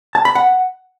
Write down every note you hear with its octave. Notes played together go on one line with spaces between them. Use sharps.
A5
B5
F#5